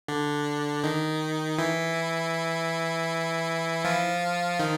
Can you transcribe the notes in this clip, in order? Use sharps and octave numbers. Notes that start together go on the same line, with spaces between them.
D3 D4
D#3 D#4
E3 E4
F3 F4
D#3 D#4